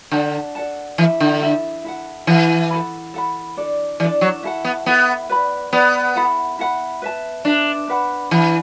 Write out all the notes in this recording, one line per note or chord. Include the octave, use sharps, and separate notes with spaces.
D3 A4 D5 F#5 A5
A4 D5 F#5 A5
E3 E4 A4 E5
D3
E4 A4 E5
E4 A4 F#5
E3 E4 A4 F#5
A4 F#5 B5
A4 F#5 B5
D4 A4 D5
E3 D4 A4 D5
F#3
E4 A4 F#5
B3
B3 E4 A4 F#5
B4 D5 B5
B3 B4 D5 B5
E4 A4 F#5 B5
E4 A4 F#5 B5
B4 E5 A5
D4 B4 E5 A5
D4 B4 F#5 B5
E3 D4 B4 F#5 B5